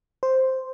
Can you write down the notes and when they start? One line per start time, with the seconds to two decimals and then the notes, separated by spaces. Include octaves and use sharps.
0.23 C5